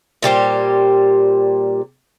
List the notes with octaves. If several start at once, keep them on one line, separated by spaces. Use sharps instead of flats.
A#2 G3 G4 C5